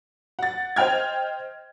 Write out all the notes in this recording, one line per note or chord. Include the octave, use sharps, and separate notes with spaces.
F#5 A6
C5 D#5 G5 F6 G#6